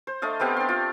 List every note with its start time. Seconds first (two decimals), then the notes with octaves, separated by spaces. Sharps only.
0.07 C5
0.22 A3 D4 D#5 F5
0.40 B3 C4 G4 F5
0.57 D4 C6
0.69 F4